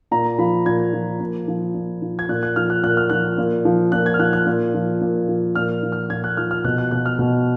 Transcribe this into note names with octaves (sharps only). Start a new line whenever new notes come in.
A#2 A#5
F3 B5
A#2 G#6
F3
A#2
F3
A#2
F3
G#6
A#2 F#6
F#6
F3 F6
F#6
A#2 F#6
F6
F3 F#6
A#2
F3
A#2 F#6
G#6
F6
F3 F#6
F#6
A#2
F3
A#2
F3
A#2 F6
F3
F6
A#2 G#6
F#6
F3 F6
F6
B2 F#6
F#6
B2 F#6
F6
B2